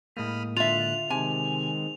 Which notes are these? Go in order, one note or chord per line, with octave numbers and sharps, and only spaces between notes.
A2 G#3 A#3 B5 D#6 F6
D3 F4 E5 F#6 F7
C3 D#3 G#3 C4 G#5